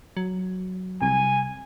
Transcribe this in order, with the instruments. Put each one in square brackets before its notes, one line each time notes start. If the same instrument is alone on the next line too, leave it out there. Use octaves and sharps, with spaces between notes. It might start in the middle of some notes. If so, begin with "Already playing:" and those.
[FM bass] F#3
[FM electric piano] C2 [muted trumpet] G#5